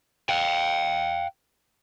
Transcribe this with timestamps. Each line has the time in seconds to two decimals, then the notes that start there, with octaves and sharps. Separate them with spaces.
0.29 F5 G5